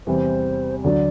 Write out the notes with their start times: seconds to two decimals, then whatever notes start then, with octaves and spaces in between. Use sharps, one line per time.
0.06 E2 C3 E3 G3 C5
0.83 D2 D3 F#3 D5